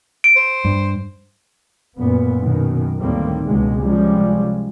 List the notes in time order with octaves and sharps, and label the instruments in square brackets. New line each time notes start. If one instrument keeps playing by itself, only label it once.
[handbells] D7
[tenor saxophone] C5
[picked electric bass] G2
[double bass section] F#2 A#2 B3
F#2 B2 D#3
D2 A2 D#3 G3 A#3 C4
C#2 B2 G#3
C3 F3 G3 G#3 C#4